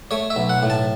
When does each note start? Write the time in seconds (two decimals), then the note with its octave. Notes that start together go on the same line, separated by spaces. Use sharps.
0.11 A3 C#5
0.30 E5
0.36 B1
0.49 F#5
0.63 A2
0.70 A5